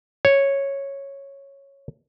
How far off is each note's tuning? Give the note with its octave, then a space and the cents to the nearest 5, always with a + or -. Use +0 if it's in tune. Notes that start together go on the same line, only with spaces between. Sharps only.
C#5 -5